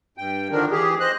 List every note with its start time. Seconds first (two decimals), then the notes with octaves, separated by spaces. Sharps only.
0.18 G2 G5
0.51 D3 D#3 F3 D4 A#4
0.71 E3 G4 G#4
1.00 C5 D#5 F#6